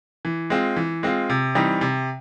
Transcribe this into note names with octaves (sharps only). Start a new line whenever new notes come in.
E3
G#3 C4 F4
E3
G#3 C4 F4
C3
E3 G3 C4 D#4
C3